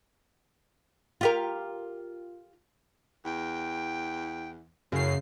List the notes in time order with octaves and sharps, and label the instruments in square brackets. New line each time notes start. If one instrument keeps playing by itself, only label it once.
[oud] F4 G4 A#4
[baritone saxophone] E2 [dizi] G5
[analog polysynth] F#2 C7 [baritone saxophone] A2 [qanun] C#3